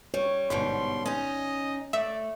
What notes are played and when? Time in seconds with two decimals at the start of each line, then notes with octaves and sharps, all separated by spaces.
0.14 G3 C#5
0.50 G1 G#2 B2 G3 C6
1.06 C#4 D#4 D#5
1.93 A3 D5 E5